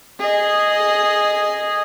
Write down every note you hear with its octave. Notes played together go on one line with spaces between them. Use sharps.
G#4 D#5